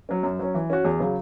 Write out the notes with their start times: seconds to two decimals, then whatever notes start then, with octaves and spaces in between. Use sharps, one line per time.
0.09 F#3 C#4
0.23 F#2
0.39 F#3 C#4
0.54 E3
0.70 C#4 F#4
0.84 E2
1.00 C#3 F#3